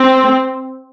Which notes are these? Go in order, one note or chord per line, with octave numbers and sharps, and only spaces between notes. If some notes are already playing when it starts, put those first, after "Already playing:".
Already playing: C4